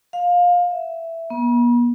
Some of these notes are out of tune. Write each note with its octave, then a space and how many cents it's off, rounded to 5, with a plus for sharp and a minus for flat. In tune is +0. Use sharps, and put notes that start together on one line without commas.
F5 +20
E5 +5
B3 -45